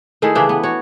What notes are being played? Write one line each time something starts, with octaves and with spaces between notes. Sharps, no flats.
D#3 A3 E4 G#4
C#3 E3 D4 G4
B3
F#4 C#5